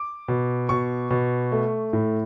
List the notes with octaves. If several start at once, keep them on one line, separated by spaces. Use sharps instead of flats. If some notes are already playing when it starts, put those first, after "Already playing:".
Already playing: D6
B2
B2 C#6
B2
A3
A2